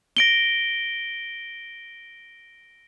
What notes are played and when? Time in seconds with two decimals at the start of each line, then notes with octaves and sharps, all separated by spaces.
0.17 A#6 D7 G7